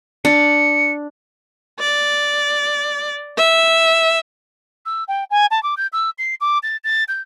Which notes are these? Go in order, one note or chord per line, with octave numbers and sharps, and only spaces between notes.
D4 C#7
D5
E5
E6
G5
G#5
A5
D6
G6
E6
C7
D6
A6
A6
G6